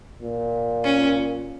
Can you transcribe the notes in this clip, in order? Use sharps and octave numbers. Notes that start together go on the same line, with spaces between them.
A#2
C#4